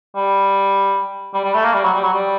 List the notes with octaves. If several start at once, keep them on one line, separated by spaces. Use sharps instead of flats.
G3
G3
G3
A3
A#3
G3
F#3
G3
F#3
G3